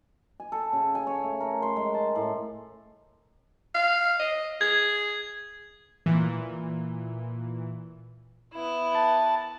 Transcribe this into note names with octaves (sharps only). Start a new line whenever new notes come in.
G#5
A4
C#3
G#5
C#5
A3
A#4
C6
G#3
A5
A2
F5
D#5
G#4 G#6
A#2 E3
B3 E4
A5